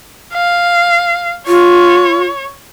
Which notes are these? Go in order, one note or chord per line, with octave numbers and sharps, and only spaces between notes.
F5
F4 C#5